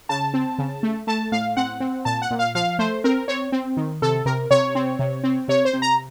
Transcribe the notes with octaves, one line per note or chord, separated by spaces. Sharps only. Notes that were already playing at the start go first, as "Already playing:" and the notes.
C#3 A5
C4
C#3
A3
A3 A5
A2 F5
C4 F#5
C4
A#2 A5
F#5
A#2
F5
F3 F5
A3 C5
C4 A#4
C4 C#5
C4
D#3
C3 A4
C3 A#4
C3 C#5
C4
C3
C4
C3 C#5
C5
C3
A#5